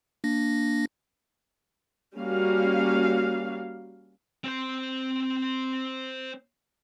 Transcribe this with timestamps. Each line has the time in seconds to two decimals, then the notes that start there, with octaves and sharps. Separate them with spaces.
0.24 A#3 D4 A#6
2.16 G3 A#3 C#4 F#4 F5
4.44 C4 C5